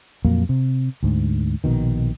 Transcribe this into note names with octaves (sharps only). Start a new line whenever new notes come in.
F2 A#2 F#3 A#3
C3
D2 G#2
A#1 B2 D#3